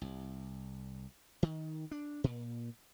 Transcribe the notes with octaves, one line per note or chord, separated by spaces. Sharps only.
C2
D#3
D4
A#2